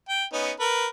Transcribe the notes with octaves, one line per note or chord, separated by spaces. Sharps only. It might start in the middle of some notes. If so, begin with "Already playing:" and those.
G5
B3 C#4 D#4
A#4 B4